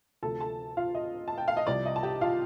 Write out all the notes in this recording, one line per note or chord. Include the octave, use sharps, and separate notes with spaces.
D2 C3 F3 A4 A5
A4 A5
F4 F5
D#5
A5
G5
F5
D#5
C2 C3 F3 D5
D#5
A5
G4 G5
F4 F5